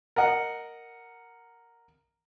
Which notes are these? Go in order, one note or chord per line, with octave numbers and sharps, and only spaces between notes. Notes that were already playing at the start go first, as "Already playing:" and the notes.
A#4 D#5 F#5